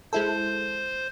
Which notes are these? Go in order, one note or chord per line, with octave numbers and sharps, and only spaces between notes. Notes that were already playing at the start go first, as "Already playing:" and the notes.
G#3 E4 A4 C5